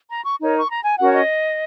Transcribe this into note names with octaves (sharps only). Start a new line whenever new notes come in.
A#5
C#6
D#4 A#4 C#5
C#6
A#5
G#5
C#4 F#4 A#4 C#5 F#5
D#5